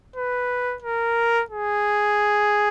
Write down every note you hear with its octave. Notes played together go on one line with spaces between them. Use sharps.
B4
A#4
G#4